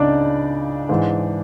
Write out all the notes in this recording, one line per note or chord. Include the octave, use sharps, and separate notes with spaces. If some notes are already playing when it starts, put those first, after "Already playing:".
Already playing: C#2 C#3 D4 D#4 D5
G#2 E3 G#3